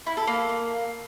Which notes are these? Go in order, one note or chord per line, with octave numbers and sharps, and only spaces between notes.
E4
A4
A#3